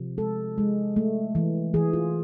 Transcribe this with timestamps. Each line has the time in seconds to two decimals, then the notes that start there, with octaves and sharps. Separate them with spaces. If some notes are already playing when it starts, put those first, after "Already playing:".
Already playing: C3 F3
0.18 G#3 A4
0.58 G#3
0.96 A3
1.35 E3
1.74 E3 G#4
1.93 F4